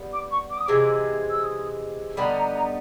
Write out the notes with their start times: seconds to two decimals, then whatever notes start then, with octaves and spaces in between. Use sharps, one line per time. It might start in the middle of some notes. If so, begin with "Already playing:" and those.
Already playing: G3 B3
0.13 D6
0.31 C#6
0.50 D6
0.58 D#6
0.66 C3 E3 G#3 D6
1.29 E6
1.43 D#6
2.17 D3 G3 B3 D#4 B5
2.35 A#5
2.55 A#5